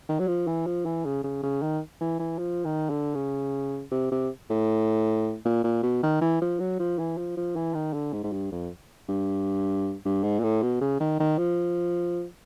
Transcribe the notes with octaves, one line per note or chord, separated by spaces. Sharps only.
D#3
F#3
F3
E3
F3
E3
C#3
C#3
C#3
D#3
E3
E3
F3
D#3
D3
C#3
C3
C3
A2
A#2
A#2
B2
D#3
E3
F3
F#3
F3
E3
F3
F3
E3
D#3
D3
G#2
G#2
G2
F2
G2
G2
G#2
A#2
A2
B2
C#3
D#3
D#3
F3